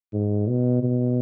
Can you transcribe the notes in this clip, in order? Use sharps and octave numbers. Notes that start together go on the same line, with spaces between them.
G#2
B2
B2